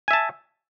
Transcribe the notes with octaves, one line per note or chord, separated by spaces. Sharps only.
E5 G#5 A5